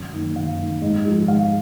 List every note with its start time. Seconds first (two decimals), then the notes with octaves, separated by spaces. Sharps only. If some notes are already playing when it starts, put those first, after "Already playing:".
Already playing: F#2
0.12 D#3 A#3
0.35 F#2 F5
0.59 D#3 A#3
0.82 G#2 D#5
1.05 F3 G#3
1.28 G#2 F5